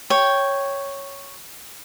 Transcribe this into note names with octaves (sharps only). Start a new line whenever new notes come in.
C#5 G5